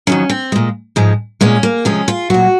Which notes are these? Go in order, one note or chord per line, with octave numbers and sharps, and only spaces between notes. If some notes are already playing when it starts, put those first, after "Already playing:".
F2 D#3 F#3 C#4
C4
A#2 G#3
G#2 F3 G#3
A#2 G#3 C#4
A#3
C3 F3 G#3 C#4
F4
A#2 F#3 F#4